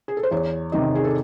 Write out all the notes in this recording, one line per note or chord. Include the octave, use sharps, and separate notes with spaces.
G#4
A4
C5
E2 C#5
C3 D#3 D#5
G#4
A4